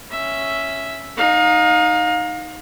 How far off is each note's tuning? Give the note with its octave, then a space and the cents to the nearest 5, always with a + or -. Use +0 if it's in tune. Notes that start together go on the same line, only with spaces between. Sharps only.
C#4 +0 E5 +0
D#4 +0 F5 +35